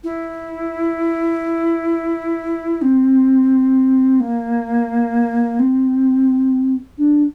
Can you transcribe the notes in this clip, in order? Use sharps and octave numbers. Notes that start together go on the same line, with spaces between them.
E4
C4
A#3
C4
D4